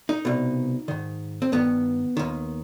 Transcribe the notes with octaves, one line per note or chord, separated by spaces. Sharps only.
D#4
C2 B2
G#2 D#3
C4
G2 D#3 B3
D#2 D#3